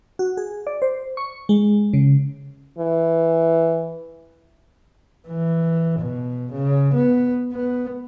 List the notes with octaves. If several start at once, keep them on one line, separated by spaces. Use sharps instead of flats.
F#4
G#4
D5
C5
C#6
G#3
C#3
E3
E3
B2
C#3
B3
B3